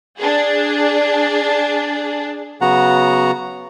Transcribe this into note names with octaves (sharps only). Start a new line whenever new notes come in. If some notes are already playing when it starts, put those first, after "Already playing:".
D4 G#4
C#3 F#3 B3 F#4 F#5 A#5